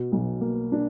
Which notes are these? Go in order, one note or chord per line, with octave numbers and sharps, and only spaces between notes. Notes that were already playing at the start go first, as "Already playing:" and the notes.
Already playing: B2
B1
A#3
D4